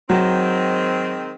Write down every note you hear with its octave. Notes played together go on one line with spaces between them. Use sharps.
D#3 F#3 G#3 C4